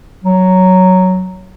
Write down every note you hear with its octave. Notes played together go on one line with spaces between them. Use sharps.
F#3